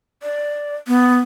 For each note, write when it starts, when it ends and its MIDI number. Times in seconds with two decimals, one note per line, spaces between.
0.23 0.75 74
0.87 1.19 59